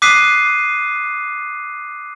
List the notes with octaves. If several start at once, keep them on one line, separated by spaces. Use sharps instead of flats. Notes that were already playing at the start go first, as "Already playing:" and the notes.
D6 D#6 F#6 B6 C7 D#7